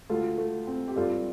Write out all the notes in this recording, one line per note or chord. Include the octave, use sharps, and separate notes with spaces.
D2 F4 A4
A3
C4
G4
G2 F4 A4